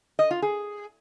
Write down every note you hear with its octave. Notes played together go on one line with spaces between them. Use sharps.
D#5
F4
G#4